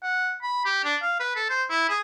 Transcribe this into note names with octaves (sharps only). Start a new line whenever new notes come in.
F#5
B5
G4
D4
F5
B4
A4
C5
E4
G#4